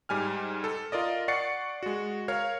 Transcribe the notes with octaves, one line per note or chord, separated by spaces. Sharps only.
G#2 G3 G#5 F6
A4
F4 A#4 D5 D#5
D5 F#5 C#6 A6 C7 C#7
G#3 F#4
A#4 C#5 F5 F6